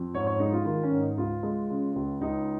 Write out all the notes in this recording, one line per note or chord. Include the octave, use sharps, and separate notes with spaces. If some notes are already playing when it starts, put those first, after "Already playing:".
Already playing: F2
G#2 C#5
C#5
G#3 D#4
F4
D#3 F4
C#4
G#2
D#4
C#2 F4
G#3
C#3
C#2
C#2 D#4